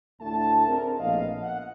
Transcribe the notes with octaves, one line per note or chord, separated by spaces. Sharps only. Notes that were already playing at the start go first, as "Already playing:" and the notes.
D2 A2 D3 A3 E4 A5
C4 D4 G#4 A#4
A#1 A2 B3 D#5 F5
F#5